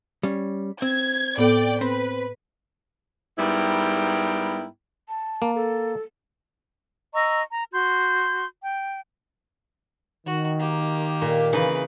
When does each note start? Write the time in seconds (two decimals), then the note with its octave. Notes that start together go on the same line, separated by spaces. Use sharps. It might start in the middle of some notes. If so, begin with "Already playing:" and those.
0.23 G3 C#4
0.82 C4 G#6
1.37 A2 B3 A4 D5 G5
1.81 C4 B4
3.39 G#2 G3 B3 E4 A#4 G5
5.09 A5
5.42 A#3
5.55 A4
7.13 D#5 A#5 C#6 E6
7.51 A#5
7.73 F#4 C6 G6
8.62 G5
10.26 D#3 F#4
10.59 A#3 G4
11.22 A#2
11.53 C#3 E3 D#4 B4